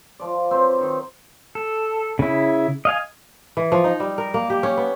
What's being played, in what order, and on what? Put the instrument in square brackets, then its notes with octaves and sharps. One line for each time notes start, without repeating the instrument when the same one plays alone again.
[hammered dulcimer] F3 D5
F#3 C4 B4 C5
D#3
[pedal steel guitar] A4
C#3 E4
D#5 F5 G#5
[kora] E3
F3
D#4
G3
A#4
A#3
G4
C#4
B3